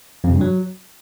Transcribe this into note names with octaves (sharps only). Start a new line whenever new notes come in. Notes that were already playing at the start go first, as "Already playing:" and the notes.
F2
C3
G2
F#3